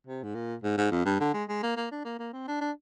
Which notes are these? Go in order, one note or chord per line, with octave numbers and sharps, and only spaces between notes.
C3
G#2
A#2
G#2
G#2
F2
G2
D3
G#3
G#3
A#3
A#3
D4
A#3
A#3
C4
D4
D4